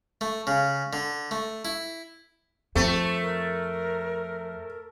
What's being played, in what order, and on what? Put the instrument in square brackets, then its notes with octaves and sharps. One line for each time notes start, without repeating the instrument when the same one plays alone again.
[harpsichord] A3
C#3
D3
A3
E4
[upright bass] F2 [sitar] A3 [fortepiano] C4
[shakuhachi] A#4